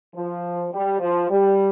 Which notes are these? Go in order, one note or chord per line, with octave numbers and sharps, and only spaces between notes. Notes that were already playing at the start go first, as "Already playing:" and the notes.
F3
G3
F3
G3